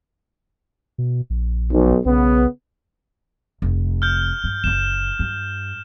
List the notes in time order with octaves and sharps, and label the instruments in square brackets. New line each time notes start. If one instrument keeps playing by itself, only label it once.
[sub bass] B2
A#1
[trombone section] B1
[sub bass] B1 [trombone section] C#3 B3
[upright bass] F1
[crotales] F6 G6
[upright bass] G2
[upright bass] F#1 C#3 [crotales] E7
[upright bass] G2